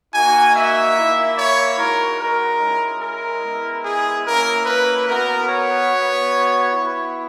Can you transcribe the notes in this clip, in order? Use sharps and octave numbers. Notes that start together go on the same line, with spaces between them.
A#3 D#4 F#4 G#5
E5
A#3 E4
C#5
G#3 D#4 F#4 A#4
A#4
G#3 C#4 E4
A#4
G#3 B3 E4
G#4
A#3 C#4 E4 A#4
B4
B3 F#4 A#4
C#5
B3 F#4
B3 E4